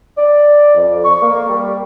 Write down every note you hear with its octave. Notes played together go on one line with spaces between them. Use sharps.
D5
F2
C#6
A#3
G3